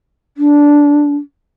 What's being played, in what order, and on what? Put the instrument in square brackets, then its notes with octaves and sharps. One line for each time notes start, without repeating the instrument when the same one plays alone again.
[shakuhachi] D4